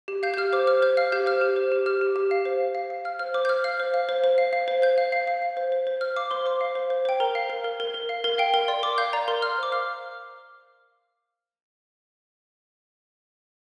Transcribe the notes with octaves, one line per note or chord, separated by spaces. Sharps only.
G4
F5 G6
G6
G4 F6
C5 D6
C5 F6
C5 G6
F5 F6
G4 G6
C5 F6
G4
C5
G4
G4 F6
G4
G4
F5
C5
F5
F5
F5
F5 F6
C5 F6
C5 D6
G6
C5 F6
F5 F6
C5
F5
C5
C5
F5
F5
C5
C5 G6
F5
F5
F5
F5
C5
C5
C5
C5 F6
F5 D6
C5 C6
C5 D6
F5
C5
C5
C5 G5
A#4 A#5
F5
A#4
A#4
A#4
A#4
F5
A#4
F5 G5
A#4
D5 C6
A#4 D6
F5 G6
D5 A#5
A#4 C6
F5 F6
C5 D6
F5 F6